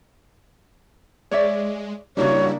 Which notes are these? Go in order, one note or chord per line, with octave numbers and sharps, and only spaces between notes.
G#3 C#5 D5 E5
C#3 G3 A#3 D4 E4 F#4 C#5